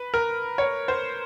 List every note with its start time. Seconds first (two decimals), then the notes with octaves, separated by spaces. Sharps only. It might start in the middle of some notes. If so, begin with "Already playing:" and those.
Already playing: B4
0.14 A#4
0.58 C#5
0.88 C5